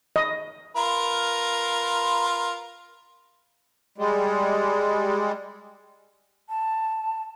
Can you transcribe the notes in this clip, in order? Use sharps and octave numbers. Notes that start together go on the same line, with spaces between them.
D#5
F4 A#4 B4
G3 G#3
A5